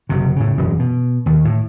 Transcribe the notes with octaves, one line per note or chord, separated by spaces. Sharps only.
F#1 C3
A2 C#3
E1 F#2
B2
D#2
A2